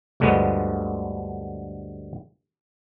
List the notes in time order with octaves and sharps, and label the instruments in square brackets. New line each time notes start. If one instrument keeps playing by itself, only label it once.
[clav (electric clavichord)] D2 G2 D3 F3 G#3 B3